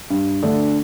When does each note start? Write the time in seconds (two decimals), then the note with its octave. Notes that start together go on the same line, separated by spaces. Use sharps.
0.10 G2
0.43 D3 A3 D4